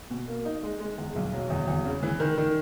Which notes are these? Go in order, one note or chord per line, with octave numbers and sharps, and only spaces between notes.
B2
A#3
D#4
G#3
G#3
E2
B1
F#3
E2
E2
C#3
E3
D#3
D#3